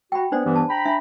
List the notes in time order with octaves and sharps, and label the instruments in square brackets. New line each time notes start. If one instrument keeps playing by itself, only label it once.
[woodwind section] F#4 [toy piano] G5 B5
[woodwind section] B3 [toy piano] D4 C5 D5
[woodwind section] G2 E3 B3
[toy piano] A5
[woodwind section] G5 A#5 B5
[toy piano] D4 E5